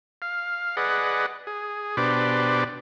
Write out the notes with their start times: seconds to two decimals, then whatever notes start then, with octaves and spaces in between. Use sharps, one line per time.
0.22 F5
0.77 G#4 B4 D5 D#5 F#5
1.47 G#4
1.97 B2 D4 G4 B4 C5 D5